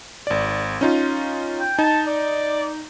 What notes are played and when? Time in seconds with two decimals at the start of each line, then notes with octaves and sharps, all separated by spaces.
0.27 G#1 D5
0.81 C#4 D#4 F4
1.60 G5
1.79 D#4 A5
2.07 D5